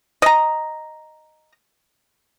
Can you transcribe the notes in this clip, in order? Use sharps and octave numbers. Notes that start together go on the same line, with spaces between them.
D#5 A#5